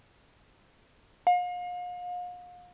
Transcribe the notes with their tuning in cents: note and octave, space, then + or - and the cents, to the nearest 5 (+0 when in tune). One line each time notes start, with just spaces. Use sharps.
F5 +40